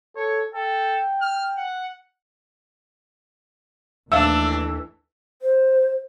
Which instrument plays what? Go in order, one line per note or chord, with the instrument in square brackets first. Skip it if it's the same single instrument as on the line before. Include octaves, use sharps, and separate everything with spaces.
[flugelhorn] A4 [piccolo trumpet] C#5
[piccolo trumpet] A4 [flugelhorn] G5
[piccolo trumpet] F6
F#5
[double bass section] D#2 E3 A3 [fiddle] D4 [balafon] E5 F5 [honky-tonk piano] E6
[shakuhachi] C5